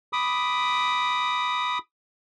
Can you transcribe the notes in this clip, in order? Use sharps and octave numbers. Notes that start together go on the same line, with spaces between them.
B5 D6 D#6